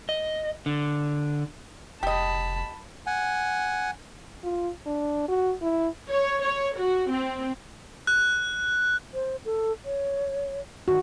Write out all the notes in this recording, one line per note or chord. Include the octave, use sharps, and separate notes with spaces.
D#5
D3
F1 G4 D#5 A5 B5
F#5 G#5
F4
D4
F#4
E4
C#5
C#5
F#4
C4
F#6
C5
A4
C#5
D#3 F#4